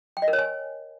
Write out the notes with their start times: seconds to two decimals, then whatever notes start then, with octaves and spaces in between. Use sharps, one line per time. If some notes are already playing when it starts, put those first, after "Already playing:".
0.17 G5
0.22 D#5
0.28 A#4
0.33 C#5
0.39 G#5